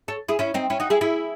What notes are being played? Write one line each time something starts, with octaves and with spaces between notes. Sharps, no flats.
A4 C#5
E4 G#4
C#4 E4
C4 D#4
C#4 E4
D#4 F#4
E4 G#4
E4 G#4